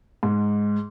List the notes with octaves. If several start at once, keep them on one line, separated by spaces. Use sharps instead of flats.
G#2